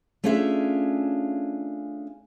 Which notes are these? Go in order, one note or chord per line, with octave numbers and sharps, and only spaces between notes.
A3 C#4 D4 F4 G#4 E5